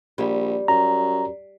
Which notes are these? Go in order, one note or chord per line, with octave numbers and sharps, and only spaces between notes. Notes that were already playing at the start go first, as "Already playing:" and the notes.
A#1 G3
F#2 A#5